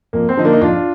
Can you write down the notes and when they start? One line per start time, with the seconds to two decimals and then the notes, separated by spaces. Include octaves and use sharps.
0.13 F2 A#3
0.29 C4
0.37 D3 F3 D#4
0.45 A#3 D4
0.53 D#4
0.61 F2 D4 F4